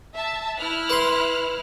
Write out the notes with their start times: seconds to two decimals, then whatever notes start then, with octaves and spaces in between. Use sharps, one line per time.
0.15 E5 A5
0.58 E4 F6 F#6
0.90 B4 C6